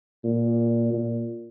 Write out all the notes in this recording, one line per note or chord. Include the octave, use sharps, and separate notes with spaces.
A#2
A#2